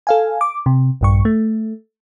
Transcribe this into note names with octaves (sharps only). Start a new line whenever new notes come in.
A4 F5 G#5
D6
C3
A#1 G2 C#6
A3